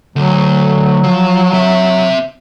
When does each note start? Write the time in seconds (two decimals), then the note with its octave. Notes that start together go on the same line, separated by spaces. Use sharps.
0.16 D2 F#3
1.03 F3
1.53 C4 E5